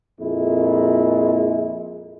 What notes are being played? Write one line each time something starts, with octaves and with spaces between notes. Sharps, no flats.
F2 A#2 G#3 E4